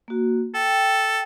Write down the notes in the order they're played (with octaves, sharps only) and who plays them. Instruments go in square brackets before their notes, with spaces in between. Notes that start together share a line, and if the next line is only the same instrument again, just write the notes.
[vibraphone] A#3 F#4
[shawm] A4 [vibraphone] G5